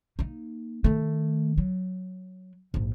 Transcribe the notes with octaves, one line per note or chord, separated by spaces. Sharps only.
A#3 D#4
D#3 A3
F#3
A#1 G#2